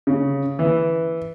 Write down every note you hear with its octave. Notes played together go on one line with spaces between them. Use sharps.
C#3
E3